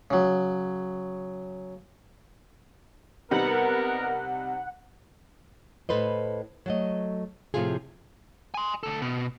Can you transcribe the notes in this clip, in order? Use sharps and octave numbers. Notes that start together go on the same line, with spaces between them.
C#3 F#3
C3 G3 B3 D#4 A#4 F#5
A2 A4 B4 C5 D#5
F#3 A3 D#5
A2 C3 F3 A3 F4 G#4
G#5 C6
D2 A4
B2